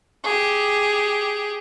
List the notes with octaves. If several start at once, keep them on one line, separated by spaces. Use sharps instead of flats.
G4 G#4